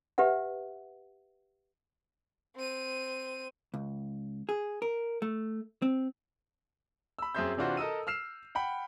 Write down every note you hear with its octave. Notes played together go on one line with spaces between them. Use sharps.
G4 B4 E5 F#5
C4 D#7
C#2
G#4
A#4
A3
C4
B5 E6
F#2 C4 G#4 E5 C6 G6
C3 E3 D4 F4 F#4 C5
A4 A#4 D#5 D#6 E6 D#7
E6 F6 C7 E7
F#5 G5 B5